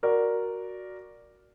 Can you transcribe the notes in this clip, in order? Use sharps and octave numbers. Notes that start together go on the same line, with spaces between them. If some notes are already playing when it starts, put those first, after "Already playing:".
F#4 A#4 D5